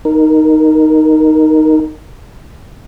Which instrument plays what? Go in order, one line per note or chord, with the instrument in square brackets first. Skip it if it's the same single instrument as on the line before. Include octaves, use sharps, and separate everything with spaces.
[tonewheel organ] D#4 A#4